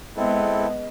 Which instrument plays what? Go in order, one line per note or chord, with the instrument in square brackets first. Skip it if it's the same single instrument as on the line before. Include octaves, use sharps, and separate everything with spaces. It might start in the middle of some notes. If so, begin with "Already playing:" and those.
[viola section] G#3 B3 [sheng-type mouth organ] C4 E4 A4 [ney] D#5